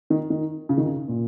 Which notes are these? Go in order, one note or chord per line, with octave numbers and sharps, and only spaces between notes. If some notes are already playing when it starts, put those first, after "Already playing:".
D#3
D#3
C#3
D#3
C#3
A#2